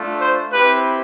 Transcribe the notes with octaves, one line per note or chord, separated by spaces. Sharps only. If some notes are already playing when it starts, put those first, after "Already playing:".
Already playing: A3 D4 F4
C5
C4 E4 G4 B4